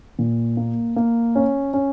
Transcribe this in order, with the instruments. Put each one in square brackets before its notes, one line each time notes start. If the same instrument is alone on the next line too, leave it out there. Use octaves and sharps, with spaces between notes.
[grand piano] A#2
A#3
A#3
C#4
C#4